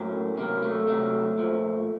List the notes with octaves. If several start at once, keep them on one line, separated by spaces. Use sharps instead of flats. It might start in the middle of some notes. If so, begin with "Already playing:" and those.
Already playing: A2 F#3 A#3 C#4
C3 D#3 F#3 A#3
A3
C3 D#3 F#3 A3
A#2 F3